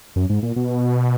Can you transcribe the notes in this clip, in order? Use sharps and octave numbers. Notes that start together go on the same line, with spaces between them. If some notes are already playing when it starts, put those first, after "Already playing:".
F#2
G#2
A#2
B2